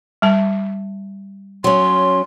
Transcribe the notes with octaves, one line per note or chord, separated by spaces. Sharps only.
G3 A5
F#3 C#4 C6